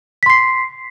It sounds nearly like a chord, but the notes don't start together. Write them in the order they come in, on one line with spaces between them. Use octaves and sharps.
B6 C6 C7